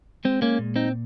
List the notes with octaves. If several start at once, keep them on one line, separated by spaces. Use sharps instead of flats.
G#3 C4
A#3 C#4
A#2
C4 D#4